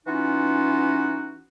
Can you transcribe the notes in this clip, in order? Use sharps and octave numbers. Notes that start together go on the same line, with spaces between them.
E3 B3 C#4 D#4 F4 F#4